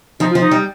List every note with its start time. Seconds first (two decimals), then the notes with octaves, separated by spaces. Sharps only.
0.20 F3 D#4
0.30 F4
0.35 F3
0.41 D#4
0.51 G3